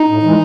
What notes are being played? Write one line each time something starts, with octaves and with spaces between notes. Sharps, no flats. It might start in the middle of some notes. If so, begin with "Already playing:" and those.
Already playing: D#4
A2
E3 G#3